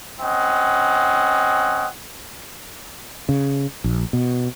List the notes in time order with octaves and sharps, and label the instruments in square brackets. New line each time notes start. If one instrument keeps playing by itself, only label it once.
[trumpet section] C4 C#4 D#5 F#5
[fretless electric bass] C#3
A#1
B2